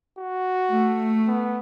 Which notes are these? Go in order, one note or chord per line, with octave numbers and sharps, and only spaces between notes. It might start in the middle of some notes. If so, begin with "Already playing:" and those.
F#4
A3
B3